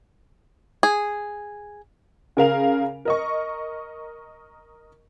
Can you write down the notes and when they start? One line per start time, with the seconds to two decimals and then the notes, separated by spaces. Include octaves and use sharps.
0.83 G#4
2.37 C#3 A#4 F5 F7
3.05 A#4 D#5 C#6